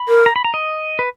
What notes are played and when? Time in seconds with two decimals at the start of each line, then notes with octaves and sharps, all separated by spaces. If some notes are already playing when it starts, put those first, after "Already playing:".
Already playing: B5
0.08 A#4
0.26 A#5
0.36 B5
0.44 A#5
0.54 D#5
0.99 B4